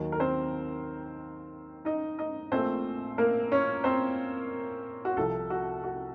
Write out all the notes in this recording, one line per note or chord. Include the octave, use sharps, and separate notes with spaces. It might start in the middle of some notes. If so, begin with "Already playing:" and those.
Already playing: D#2 D#3 F#3
A#4
C4 C5
D#4 D#5
D#4 D#5
A#1 A#2 A3 C4 C5
A#3 A#4
C#4 C#5
C4 C5
F#4
C2 C3 F3 A4
F#4
F#4